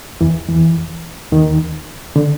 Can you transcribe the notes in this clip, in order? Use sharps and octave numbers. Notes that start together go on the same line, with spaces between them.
E2 E3
E2 E3
D#2 D#3
D3